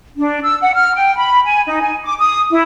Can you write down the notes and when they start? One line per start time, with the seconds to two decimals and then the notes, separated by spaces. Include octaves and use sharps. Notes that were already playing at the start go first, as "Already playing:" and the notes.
0.17 D4
0.44 E6
0.61 F#5
0.76 F6
0.95 G5
1.15 B5
1.46 G#5
1.66 D#4
1.82 G#5
2.04 D6
2.19 D#6
2.50 E4